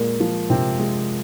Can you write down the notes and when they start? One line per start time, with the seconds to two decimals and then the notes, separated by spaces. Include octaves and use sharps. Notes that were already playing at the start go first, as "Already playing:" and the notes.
Already playing: A#2 G#3 A#3
0.20 F3
0.50 C3 F3 C4
0.80 G#3